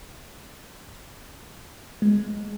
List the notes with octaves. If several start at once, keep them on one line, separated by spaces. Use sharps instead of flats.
G#3